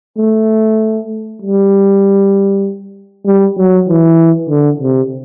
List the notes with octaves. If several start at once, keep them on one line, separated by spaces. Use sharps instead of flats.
A3
G3
G3
F#3
E3
D3
C3